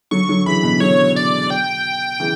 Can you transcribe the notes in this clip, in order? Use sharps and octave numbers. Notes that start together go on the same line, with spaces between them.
D3 F#3 C#6
D3 F#3
C#3 E3 B5
B2 D3
D3 F#3 C#5
D5
G5
C#3 E3